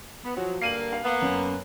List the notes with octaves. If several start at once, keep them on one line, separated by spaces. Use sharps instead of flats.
B3
F3 F#3 F#4 F#5
G2 D3 A#3 C7 D#7 F#7
F5
A#3 B3
F#2